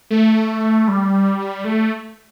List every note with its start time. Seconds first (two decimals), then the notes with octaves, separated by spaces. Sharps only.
0.11 A3
0.88 G3
1.65 A3